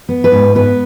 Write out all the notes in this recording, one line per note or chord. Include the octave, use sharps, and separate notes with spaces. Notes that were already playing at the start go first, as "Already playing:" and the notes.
B3
B4
G#2
B3 B4